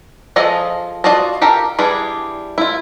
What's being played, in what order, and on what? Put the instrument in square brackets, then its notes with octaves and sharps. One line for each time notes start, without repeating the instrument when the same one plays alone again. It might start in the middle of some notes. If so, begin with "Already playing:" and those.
[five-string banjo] F3 F4 G#4 A4 D#5
F4 F#4 D5 D#5 A5
G4 A4 A#4 F5
E3 G3 D4 G#4
E4 F4